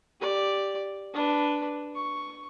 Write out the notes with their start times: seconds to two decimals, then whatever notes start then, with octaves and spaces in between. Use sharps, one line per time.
0.21 G4 D5
1.14 D4 B4
1.95 C#6